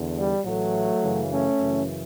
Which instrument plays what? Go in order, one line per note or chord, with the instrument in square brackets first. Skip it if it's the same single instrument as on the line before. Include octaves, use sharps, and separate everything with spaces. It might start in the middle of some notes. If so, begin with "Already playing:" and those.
Already playing: [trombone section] E2 D3
G3
A1 A2 E3 F#3 A3
F#2 C#3 E3
A3 C#4
F#2 C#3 E3